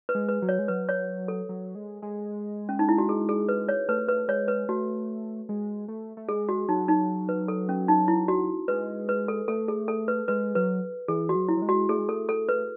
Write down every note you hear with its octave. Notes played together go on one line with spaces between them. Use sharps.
B4
G#3
B4
F#3
C#5
G#3
F#3 B4
C#5
A4
F#3
G#3
G#3
C#4
D#4
E4
F#4
G#4
G#4
B4
C#5
A3 B4
B4
G#3 C#5
B4
A3 F#4
G#3
A3
A3
G#3 G#4
F#4
F#3 D#4
D#4
B4
A4
C#4
D#4
E4
F#4
G#3 B4
B4
A4
A3 A4
G#4
A4
B4
G#3 B4
F#3 B4
E3 G#4
F#4
F#3
E4
F#3
G#3
F#4
A3 G#4
G#3
A3 A4
A4
B4